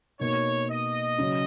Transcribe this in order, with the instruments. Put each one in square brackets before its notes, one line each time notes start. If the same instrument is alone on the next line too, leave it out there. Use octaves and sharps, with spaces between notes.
[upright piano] B2 A#3 D#4 [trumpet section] C#5
[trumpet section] D#5
[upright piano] C#3 F#3 C#4